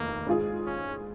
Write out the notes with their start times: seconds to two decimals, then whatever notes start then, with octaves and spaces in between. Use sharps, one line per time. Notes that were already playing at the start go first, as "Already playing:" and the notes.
Already playing: F1 D#2 D#3 A#3
0.27 G#2 G#3 F4 G#4
0.66 C#4